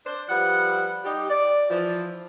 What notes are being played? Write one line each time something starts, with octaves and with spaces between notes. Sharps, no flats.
D4 C5
F3 G3 B4 F#5
G3 D#4 G4
D5
E3 F3